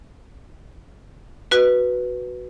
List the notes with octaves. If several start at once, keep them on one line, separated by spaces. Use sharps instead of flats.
F#4 B4